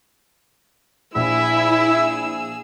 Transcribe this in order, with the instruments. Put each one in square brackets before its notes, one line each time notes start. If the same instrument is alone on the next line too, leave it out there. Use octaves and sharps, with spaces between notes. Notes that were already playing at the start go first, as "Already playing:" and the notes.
[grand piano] A#1 [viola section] E4 [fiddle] G#4 E6 [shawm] E5